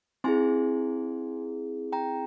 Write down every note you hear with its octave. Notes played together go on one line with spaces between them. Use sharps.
C4 E4 G#4 G#5 C6
G5 A#5